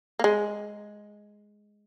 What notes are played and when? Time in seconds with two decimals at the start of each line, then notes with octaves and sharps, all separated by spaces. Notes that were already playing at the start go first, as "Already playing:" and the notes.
0.19 A#3
0.24 G#3